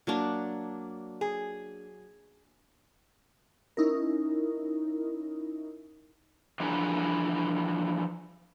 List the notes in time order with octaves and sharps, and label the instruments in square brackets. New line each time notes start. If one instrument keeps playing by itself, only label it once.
[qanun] F#3 A#3 D4
[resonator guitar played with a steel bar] G#4
[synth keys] C#4 D#4 E4 A#4
[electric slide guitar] E3 F3 D4 G#4 A#4 B4